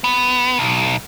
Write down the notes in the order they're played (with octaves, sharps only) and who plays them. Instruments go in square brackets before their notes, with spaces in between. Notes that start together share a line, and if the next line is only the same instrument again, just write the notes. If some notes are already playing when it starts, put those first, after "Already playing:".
[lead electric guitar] B3
B1